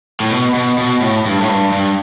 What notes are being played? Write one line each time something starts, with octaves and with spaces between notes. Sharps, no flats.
A2
B2
B2
B2
A2
G2
A2
G2
G2